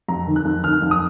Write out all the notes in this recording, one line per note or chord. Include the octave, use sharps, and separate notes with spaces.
F2 A#5
D#3
F#6
F2
D#3 F6
F2
D#6